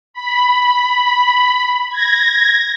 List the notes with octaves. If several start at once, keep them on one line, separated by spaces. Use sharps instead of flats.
B5
G#6 A#6